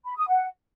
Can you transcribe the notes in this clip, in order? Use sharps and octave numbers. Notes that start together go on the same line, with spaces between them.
B5
D#6
F#5